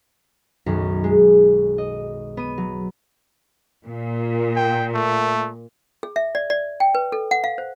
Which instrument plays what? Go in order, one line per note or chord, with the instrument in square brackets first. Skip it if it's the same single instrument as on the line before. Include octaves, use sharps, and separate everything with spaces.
[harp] B1 F#2 D#3
G#3
D#5
B3 D#7
F#3
[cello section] A#2
[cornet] G5
A3
[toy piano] G#4
E5
D5
D5
G5
B4
A4
F#5
F5
C5